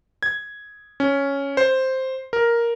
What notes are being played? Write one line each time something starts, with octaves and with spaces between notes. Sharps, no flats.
G#6
C#4
C5
A#4